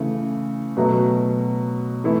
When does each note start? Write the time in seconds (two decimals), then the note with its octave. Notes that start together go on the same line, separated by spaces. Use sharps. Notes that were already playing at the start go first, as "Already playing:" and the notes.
Already playing: C#3 E3 A3
0.77 B2 F#3 A3
2.04 E3 A3 E4